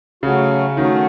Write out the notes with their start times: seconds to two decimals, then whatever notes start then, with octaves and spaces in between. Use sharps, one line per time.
0.23 C#3 F#3 A3 C#4 F#4
0.77 D#3 F#3 A3 C#4 F#4